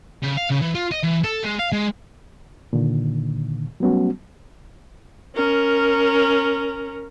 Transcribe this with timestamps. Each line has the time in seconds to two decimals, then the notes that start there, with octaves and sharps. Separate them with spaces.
0.22 C#3
0.37 F5
0.50 C#3
0.61 E3
0.75 F4
0.92 D#5
1.04 E3
1.24 A4
1.44 G#3
1.59 F5
1.72 G#3
2.73 A#2 D3 D#3
3.80 F#3 G3 A3 B3 C#4 F#4
5.35 C#4 A#4